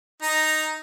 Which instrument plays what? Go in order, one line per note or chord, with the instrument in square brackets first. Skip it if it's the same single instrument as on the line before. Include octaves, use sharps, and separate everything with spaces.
[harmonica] D#4 A#5